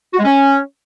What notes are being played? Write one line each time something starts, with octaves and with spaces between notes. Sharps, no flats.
F#4
G#3
C#4